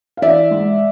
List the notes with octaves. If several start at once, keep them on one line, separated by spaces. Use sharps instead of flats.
F5
E3 D5 E5
G#2